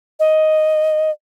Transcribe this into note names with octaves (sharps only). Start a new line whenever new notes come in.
D#5